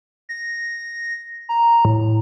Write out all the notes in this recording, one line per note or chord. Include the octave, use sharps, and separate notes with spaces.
A#6
A#5
A2